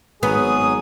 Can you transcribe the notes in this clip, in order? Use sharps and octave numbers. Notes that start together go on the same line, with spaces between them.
G#1 F#3 B3 G#4 D#6